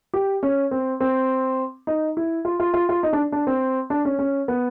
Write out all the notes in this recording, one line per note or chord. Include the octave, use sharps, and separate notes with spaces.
G4
C#4
C4
C4
D#4
E4
F4
F4
F4
F4
D#4
D4
D4
C4
D4
C#4
C#4
B3